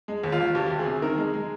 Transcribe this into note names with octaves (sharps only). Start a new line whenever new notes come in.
G#3
D#2
F4
D#2
D2 G4
D2
G#4
C3
D#3 A#4
G#3
G#3